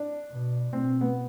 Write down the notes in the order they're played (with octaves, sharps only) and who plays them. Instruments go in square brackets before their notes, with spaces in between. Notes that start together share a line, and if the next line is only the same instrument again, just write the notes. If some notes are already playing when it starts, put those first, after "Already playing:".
Already playing: [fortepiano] D4
[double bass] B2
[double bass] B2 [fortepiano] C4
[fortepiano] B3